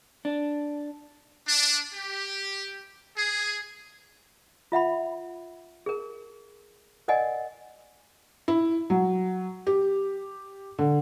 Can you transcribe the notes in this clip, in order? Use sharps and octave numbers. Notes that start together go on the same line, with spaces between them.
D4
D4
G4
G#4
F4 E5 F#5 B5
G#4 A#4
A#4 D5 D#5 F#5 G#5
E4
F#3
G4
D3